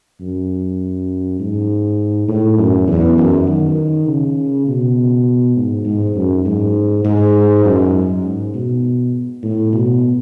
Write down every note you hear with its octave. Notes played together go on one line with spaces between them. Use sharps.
F#2
G#2
A2
F#2
E2
F#2
D#3
C#3
B2
G#2
G#2
F#2
G#2
G#2
F#2
G#2
B2
A2
B2